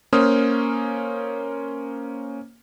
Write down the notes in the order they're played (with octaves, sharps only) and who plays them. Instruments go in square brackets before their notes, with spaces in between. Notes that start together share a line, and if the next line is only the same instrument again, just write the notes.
[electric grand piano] A#3 C#4 C5 D#6 F6